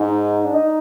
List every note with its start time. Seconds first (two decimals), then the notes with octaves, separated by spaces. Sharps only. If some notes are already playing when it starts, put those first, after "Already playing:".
Already playing: G#2 D#4
0.44 D4
0.54 D#4